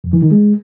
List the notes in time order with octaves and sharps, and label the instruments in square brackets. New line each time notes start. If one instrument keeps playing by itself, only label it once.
[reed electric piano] F2
E3
D#3
G#3